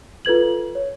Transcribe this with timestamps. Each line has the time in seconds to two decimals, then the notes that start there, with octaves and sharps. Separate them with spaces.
0.25 F4 A4 B4 G#6 F#7
0.75 C#5